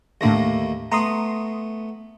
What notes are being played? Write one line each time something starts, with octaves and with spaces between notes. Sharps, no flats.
D#2 A2 D3 A3 A#3 A#6
A3 B3 A#5 C6 D#6